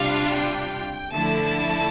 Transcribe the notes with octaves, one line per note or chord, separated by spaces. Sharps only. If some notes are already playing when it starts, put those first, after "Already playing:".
Already playing: C3 G3 D4 F4 F5
G5
D3 F3 A3 E4 A5